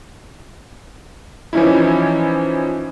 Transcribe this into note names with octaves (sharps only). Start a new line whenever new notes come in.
E3 F3 C#4 D#4 E4